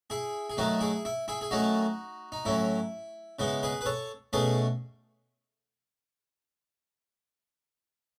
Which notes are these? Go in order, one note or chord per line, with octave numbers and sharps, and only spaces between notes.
E4 G#4
G#4
D#3 F#3 A3 D#4 F#4
E4 G#4
E4
E4 G#4
G#4
D#3 F#3 A3 C#4 D#4 F#4
D#4
A2 F#3 C#4 E4
C#3 G#3 B3 E4
G#4 B4
B4
A4 C#5
B2 A3 C#4 G#4 B4